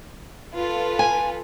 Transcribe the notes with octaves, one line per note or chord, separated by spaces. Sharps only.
F4 A4 B4
G#5